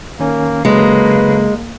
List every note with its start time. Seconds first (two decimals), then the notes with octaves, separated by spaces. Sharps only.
0.20 D#3 A#3 C#4
0.65 C#3 F#3 G#3 A#3 A4 B4